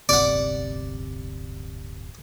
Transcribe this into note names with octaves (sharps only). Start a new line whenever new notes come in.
D1 G1 C3 D5 F#5